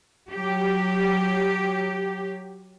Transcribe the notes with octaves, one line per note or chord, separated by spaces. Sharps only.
F#3 G4